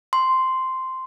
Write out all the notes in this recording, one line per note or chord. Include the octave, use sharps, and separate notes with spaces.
C6